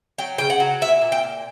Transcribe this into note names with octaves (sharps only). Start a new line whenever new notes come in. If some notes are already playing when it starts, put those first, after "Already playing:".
F#3 G5
C#3 G5
F#5
F#3
A#2 E5
A#2
G5
A#2